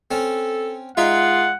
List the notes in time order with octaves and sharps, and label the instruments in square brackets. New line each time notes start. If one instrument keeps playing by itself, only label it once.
[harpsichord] C4 C#4 [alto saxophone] A4
[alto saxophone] G#3 [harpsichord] D#4 E5 [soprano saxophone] F4 [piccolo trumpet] F#5